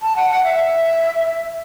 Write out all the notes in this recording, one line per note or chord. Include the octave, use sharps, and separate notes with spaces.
A5
F#5
F#5
E5